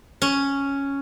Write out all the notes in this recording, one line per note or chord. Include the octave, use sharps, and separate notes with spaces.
C#4